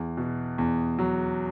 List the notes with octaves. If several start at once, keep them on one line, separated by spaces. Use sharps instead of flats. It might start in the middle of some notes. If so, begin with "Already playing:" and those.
Already playing: E2
B2
E2
F#3